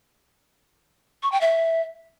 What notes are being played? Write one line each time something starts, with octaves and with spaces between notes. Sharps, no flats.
C#6
G5
E5